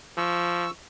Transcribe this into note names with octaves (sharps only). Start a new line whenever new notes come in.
F3 C#6 E6